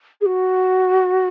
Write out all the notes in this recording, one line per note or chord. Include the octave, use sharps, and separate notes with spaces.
G#4
F#4